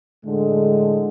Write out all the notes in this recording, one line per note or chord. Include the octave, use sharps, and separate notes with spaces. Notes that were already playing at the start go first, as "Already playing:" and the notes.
A2 D3 G#3